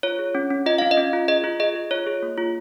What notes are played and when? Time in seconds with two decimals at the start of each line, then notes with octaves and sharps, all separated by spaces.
0.03 F4 C#5
0.19 G#4
0.35 C#4
0.50 C#4
0.66 F4 D#5
0.78 C#4 F5
0.91 D#5
0.97 C#4
1.13 F4
1.28 G#4 D#5
1.44 F4
1.60 G#4 D#5
1.75 G#4
1.91 F4 C#5
2.07 G#4
2.23 A#3
2.37 F4